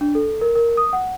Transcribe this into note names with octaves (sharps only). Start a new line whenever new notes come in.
D4
A4
A#4
A#4
D#6
F#5